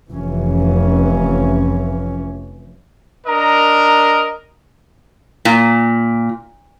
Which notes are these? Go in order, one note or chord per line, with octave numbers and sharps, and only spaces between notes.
F1 F2 E3 C#4
D4 A#4 D#5 A#5
A#2